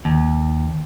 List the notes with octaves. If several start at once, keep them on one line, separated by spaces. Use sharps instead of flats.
D#2